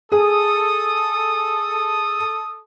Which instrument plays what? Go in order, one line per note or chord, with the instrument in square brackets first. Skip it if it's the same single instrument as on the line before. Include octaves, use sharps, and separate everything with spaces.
[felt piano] G#4 [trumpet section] A4 D#6